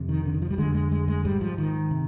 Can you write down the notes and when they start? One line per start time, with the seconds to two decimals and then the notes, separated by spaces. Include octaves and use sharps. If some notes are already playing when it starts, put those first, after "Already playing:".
Already playing: F2 C3
0.09 D#3
0.25 D3
0.34 D#3
0.42 F3
0.50 G3
0.58 F2 D3 G#3
0.74 G#3
0.92 G#3
1.08 G#3
1.25 G#2 G3
1.41 F3
1.58 D#3
1.91 C3